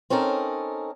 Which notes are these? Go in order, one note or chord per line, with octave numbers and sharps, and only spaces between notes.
C4 C#4 D#4 A4 A#4